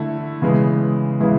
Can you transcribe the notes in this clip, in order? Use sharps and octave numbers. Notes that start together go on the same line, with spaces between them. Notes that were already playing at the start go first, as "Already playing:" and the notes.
Already playing: D3 A3 E4
C#3 E3 G#3 B3
C#3 E3 G#3 B3 E4